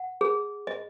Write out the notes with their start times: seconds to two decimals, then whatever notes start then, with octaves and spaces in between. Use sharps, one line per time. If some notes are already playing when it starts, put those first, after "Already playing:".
Already playing: F#5
0.21 G#4
0.67 D#5